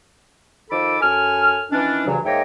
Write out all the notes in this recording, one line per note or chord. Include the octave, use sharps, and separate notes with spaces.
D#3 F3 A4 B5 D6
F#2 A4 G#5 F6
D#3 E3 C#4 D4
D2 G2 C#3 E3 F#3
G#2 A#3 C#5 D#5 E5 G5